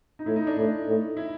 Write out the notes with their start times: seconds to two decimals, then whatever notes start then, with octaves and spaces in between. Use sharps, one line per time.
0.19 D#4
0.26 A2 E4
0.36 D#4
0.47 D4
0.56 A2 D#4
0.87 A2
1.17 E4